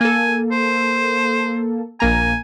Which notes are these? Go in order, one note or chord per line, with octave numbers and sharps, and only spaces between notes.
A#3 A4 G#5
C5
A#1 A#3 G#5 A#5